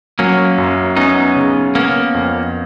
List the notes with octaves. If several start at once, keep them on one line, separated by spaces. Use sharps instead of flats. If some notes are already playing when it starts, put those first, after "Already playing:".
F#3 A#3 C#4
F#2
B3 C#4 D#4
C#3
A#3 B3 C#4
F2